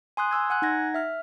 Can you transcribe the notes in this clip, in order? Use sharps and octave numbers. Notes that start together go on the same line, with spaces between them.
G#5 C6 D#6 F#6
G#5 C6 E6 G#6
F#5 G#5 F#6
D#4 F#5 G#6 A#6
E5 F6